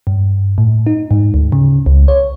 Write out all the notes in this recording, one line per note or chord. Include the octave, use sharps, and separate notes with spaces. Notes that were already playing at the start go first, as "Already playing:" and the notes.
G2
A2
D#4
G#2
D2
C#3
C#2
C#5